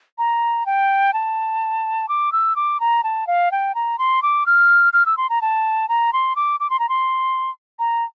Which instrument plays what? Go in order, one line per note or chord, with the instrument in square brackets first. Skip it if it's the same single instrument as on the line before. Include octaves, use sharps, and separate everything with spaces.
[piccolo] A#5
G5
A5
D6
E6
D6
A#5
A5
F5
G5
A#5
C6
D6
F6
F6
E6
C6
A#5
A5
A#5
C6
D6
D6
C6
A#5
C6
A#5